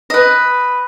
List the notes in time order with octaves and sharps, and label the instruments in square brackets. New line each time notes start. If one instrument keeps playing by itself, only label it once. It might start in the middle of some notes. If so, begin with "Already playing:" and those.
[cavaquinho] B4 D#5